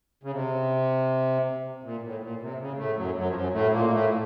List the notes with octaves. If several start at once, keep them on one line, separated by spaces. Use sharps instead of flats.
C#3
C3
A#2
A2
A#2
C3
C#3
A2 A3
F#2 F#3
F#2 F#3
F3
F#2 F#3
A2 A3
A#2 A#3
A#3
A2 A3